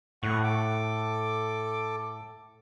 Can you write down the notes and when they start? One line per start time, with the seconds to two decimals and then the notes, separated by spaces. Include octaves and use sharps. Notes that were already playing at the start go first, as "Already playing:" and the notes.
0.23 A2 F#5 C#6
0.44 A4 D6